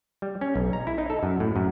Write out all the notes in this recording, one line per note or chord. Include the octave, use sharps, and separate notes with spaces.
G3
C#4
B1
A#5
E4
D#4
A4
F#2
A2
F#2